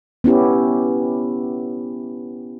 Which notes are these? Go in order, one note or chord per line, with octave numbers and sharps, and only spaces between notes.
B3 C#4 E4 G4